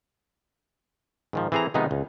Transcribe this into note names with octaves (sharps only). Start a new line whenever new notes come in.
G#2 D#3 F3
E3 C4 G#4 A4 A#5
C3 D#3 F3 G#3 B3 D#4
C#2